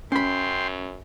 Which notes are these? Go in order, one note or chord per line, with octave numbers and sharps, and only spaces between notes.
F#2 C#4 G5 B5 C6